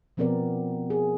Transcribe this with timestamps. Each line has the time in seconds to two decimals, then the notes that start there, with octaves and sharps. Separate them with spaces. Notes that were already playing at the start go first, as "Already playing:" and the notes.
0.17 B2 F3 B3 C4 A#4 D5
0.90 G#4